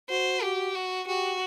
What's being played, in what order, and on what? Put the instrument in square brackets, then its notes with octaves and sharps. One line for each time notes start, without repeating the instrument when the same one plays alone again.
[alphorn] F#4 [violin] C5
[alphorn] F#4 [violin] G4
[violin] F#4
[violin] F#4 [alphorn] G4